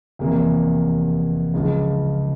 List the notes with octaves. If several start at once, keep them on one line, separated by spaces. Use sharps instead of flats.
F1 E2 C3 E3 A#3
C#2 C#3 F3